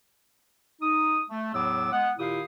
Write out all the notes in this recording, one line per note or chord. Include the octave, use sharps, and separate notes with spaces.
D#4 D#6
A3
E2 A2 F#3 B3 D6 E6
G#3 B3 F#5
A#2 D#3 E4 G4 F5 D#6